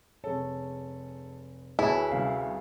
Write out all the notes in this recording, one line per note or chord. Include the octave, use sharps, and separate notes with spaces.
F1 G#4 A4 C#5
D2 B3 E4 G#4 B4 C#5 A5
C2 C#4 F5 C7